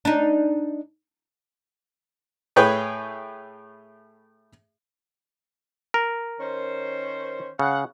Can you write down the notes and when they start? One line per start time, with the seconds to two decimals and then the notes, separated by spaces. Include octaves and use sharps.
0.05 D4 D#4
2.56 A2 G#4 B4 C#5 G5
5.94 A#4
6.40 D#3 C#4 C5
7.59 C#3 F5 F#5